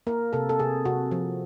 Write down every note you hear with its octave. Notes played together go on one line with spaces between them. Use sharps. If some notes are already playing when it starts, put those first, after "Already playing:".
A#3 A#4
C3 A4
A4
C3 G#4
C3 F#4
F3